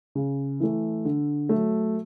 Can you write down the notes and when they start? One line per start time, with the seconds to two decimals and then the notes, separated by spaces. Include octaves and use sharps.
0.15 C#3
0.60 E3 A3
1.05 D3
1.49 F#3 A3